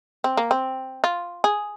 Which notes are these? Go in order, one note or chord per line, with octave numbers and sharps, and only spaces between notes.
C4
A#3
C4
F4
G#4